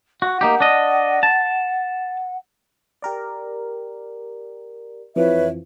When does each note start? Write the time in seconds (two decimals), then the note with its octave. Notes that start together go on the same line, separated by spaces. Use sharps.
0.22 F#4 F#5
0.41 A#3 D#4 G4
0.60 D4 D#5
1.23 A5
3.02 G4 A#4 D5
5.16 F2 E3 F3 B4 C#5 E5